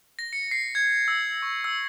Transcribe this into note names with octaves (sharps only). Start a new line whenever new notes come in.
A#6
C#7
C7
G#6
E6
C#6
E6